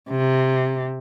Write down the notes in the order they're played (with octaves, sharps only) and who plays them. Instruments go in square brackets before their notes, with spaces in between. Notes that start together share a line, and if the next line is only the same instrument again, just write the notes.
[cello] C3